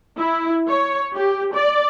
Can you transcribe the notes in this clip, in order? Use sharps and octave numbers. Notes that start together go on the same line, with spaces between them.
E4
C#5
G4
D5